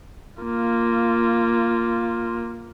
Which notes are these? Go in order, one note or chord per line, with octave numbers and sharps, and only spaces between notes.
A#3 F4